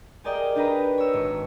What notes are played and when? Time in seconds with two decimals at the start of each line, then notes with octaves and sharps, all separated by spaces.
0.24 G4 G#4 A#4 D5 D#5 G5
0.55 D4 D#4 G4 B4 A#5
0.98 C#5 E6
1.13 G#1 C#6